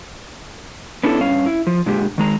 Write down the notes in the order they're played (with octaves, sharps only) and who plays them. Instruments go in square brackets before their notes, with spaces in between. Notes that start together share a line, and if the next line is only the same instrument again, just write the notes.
[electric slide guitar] B3 C#4 D4 E4 G4 A4
G2 C#4 F5
E4
F3
A#2 D3 G#3 G4
D#3 G#3 A#5